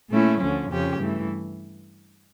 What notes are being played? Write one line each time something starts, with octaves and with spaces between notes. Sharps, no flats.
A#2 A3 C#4 E4
D2 D3 F3 C#4
F2 C#3 F3 C#4 G4
G2 E3 A3